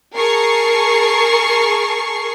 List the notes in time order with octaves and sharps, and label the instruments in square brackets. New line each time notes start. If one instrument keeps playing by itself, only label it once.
[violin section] G#4 A#4 A5 C#6 C7